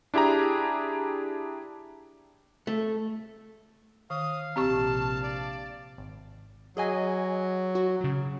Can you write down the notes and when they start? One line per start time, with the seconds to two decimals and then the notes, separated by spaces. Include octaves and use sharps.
0.14 D4 E4 G4 G#4 A#5
2.67 A3
4.10 D#3 F5 D#6
4.56 A#1 C3 C4 G4 A5 C#6
5.23 D5
5.98 G#1
6.77 F#3 G#4 D#5 G#5
7.75 F#4
8.01 C#3 F#3